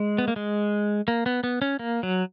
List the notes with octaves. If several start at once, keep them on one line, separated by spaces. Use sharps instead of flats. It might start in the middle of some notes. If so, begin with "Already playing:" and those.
Already playing: G#3
B3
A#3
G#3
A#3
B3
B3
C#4
A#3
F#3